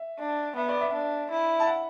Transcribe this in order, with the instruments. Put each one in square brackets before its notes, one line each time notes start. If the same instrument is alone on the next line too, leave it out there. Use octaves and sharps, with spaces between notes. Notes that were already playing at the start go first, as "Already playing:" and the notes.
Already playing: [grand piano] E5
[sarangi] D4
[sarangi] B3 [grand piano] E5
[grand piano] D5
E5
[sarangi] D4
E4
[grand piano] A5
F#5